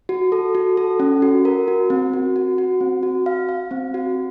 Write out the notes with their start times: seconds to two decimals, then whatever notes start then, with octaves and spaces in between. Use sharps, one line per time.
0.09 F#4
0.32 A4
0.55 F#4
0.77 A4
1.00 C#4
1.22 F#4
1.45 A#4
1.68 F#4
1.90 C4
2.13 F#4
2.36 F#4
2.58 F#4
2.81 C4
3.03 F#4
3.26 F5
3.49 F5
3.71 C4
3.94 F#4